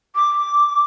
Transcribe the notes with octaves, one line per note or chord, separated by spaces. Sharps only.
D6